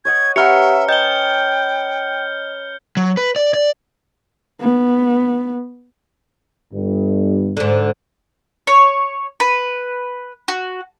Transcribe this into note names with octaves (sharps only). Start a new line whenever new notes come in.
C#5 D#5 F#5 G#6
C#4 G4 B4 E5 F#5 A#5 F6 C#7
D#5 G5 G6 G7
F#3
B4
D5
D5
B3
G1 G2
G#2 D3
C#5
B4
F#4